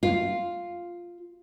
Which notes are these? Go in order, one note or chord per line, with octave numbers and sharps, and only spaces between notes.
F4